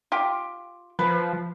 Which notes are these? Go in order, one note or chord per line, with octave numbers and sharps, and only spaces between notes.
F4 G4
F3 B4